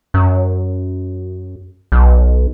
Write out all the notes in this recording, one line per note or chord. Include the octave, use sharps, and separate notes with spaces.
F#2
B1